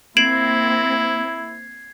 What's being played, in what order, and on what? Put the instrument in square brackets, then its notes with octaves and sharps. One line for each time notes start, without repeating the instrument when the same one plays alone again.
[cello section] A#3 C4 [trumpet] E4 [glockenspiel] G#6 C7 [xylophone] D7 E7 F#7